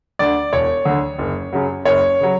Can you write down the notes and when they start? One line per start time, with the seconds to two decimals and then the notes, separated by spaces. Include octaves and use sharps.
0.19 D2 D3 D5
0.53 E1 C#5
0.85 D2 D3
1.18 F#1
1.53 F#2 C#3 F#3
1.85 F#1 C#5
2.20 C#3 F#3